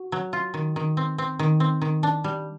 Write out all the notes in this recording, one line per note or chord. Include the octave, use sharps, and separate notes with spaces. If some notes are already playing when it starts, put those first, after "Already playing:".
Already playing: F#4
F#3
F4
D#3
D#3
C4
C4
D#3
C4
D#3
D4
G3